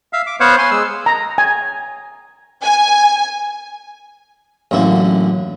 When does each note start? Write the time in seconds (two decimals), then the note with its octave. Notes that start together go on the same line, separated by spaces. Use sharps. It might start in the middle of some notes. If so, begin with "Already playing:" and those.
0.13 E5 F5
0.27 D6
0.40 B3 C5 C#5 F5 F#5
0.58 G#5 C6
0.71 G#3 E6
1.06 A#5
1.38 G#5
2.62 G#5
4.71 A1 F#2 D3 A#3 E4